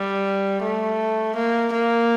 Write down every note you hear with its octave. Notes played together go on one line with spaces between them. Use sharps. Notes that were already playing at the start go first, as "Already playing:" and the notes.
Already playing: G3
A3
A#3
A#3